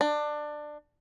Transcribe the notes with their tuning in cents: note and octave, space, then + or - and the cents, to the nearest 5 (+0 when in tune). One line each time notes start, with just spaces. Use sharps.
D4 +20